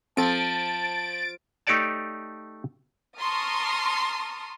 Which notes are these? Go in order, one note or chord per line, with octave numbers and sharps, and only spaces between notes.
F3 C4 A4 A5 A6 D7
A3 D#4 G4 C#5 D5 A5
A5 A#5 C6 C#6 D#6 F6